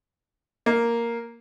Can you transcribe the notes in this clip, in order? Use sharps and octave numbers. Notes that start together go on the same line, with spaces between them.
A#3